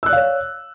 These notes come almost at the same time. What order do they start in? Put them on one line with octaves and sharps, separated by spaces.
E6 F#6 D5 F5 C#5